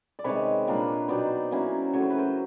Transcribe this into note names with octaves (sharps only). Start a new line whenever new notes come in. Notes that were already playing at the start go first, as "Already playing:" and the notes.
D5
C3 D#3 G#3 B4 C#5
A#2 G3 A#3 D4
B2 F#3 B3 D#4 C5 D5
F#3 A#3 C#4 E4
C#3 F#3 A3 C#5
C5
B4
A#4 C5